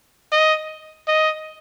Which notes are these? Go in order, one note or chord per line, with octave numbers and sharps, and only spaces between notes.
D#5
D#5